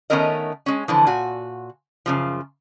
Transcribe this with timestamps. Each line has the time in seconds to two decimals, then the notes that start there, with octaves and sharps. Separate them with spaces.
0.10 D#3 A3 B3 C#4 A#4 D#5
0.66 G#3 C#4
0.88 D3 E3 F3
1.07 A#2 F#4 G#5
2.06 F#2 C#3 F3